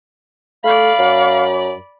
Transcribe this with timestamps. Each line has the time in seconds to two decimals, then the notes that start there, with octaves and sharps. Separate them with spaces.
0.64 A3 D5 F5 B5
0.98 F#2